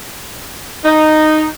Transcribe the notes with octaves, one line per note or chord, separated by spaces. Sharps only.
D#4